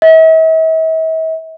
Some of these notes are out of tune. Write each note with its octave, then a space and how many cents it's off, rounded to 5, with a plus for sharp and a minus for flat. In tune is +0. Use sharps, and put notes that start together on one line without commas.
E5 -45